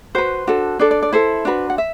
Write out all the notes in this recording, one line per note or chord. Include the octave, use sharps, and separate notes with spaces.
F#4 B4 C5
D4 F#4 A4
D4 A4 D5
D5
D5
E4 A4 C5
D4 F#4 B4
F#5
E5